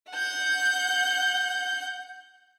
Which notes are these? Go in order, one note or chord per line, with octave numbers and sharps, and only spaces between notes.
F#5 G6